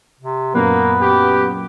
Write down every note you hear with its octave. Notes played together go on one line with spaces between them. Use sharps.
C3
F#2 A#2 A#3 B3 B4
G4